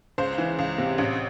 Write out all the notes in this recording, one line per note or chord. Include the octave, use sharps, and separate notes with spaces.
C#2 C5
E3
C#2
C3
A1